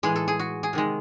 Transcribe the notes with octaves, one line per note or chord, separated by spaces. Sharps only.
A2 E3 G#3 G#4
A4
G#4
F#4
G#4
C3 D#3 G#3